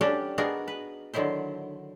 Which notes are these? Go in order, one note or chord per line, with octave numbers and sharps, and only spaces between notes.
G3 C#4 D4 F#4 G4 A4
B3 D4 D#4 F#4 G#4 A#4
B4
D3 D#3 F#3 E4 C5